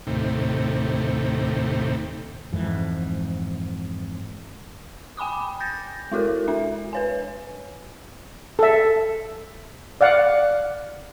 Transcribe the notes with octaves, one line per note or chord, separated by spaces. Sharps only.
D#2 A2 C3
F2 G#2 E3
G5 G#5 B5 D6 D#6
G6 A6 A#6
G#3 E4 F#4 A4 A#4
D4 E5
B4 C#5 G#5
A4 E5
D5 F5 F#5